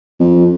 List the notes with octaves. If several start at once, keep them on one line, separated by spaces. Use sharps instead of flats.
F2